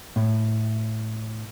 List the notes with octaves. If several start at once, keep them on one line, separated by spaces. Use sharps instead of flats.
A2